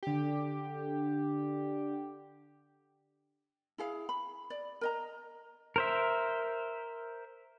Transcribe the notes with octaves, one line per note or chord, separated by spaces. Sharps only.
D3 G4
E4 G#4 F5
B5
D5
A#4 D#5 A#5
A#4 C5 E5